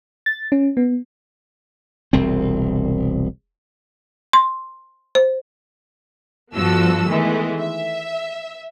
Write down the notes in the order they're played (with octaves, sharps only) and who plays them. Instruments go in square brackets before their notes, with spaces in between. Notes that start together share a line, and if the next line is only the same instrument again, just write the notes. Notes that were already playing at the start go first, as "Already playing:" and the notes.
[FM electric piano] A6
C#4
B3
[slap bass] E1 C2 C4
[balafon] C6
C5
[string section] G2 F3 B3 F#4 A4 E6
D#3 E3 G#3 A3 B3
E5